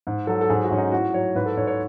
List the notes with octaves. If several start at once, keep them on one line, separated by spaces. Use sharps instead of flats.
G#2
F#3 A4
A4
G#2 G#4
F#4
G#2 C#4
D#4
A2 F#4
F#3 C#5
G#2 B4
A4
G#2 C#5
C#5